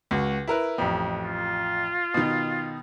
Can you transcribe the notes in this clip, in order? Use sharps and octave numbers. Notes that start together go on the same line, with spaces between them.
C#2 F#4
E4 A#4 B4
A1 F2
F4
B2 D#3